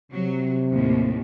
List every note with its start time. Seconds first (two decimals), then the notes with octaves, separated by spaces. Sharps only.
0.12 C3 F#3
0.71 D#2 A2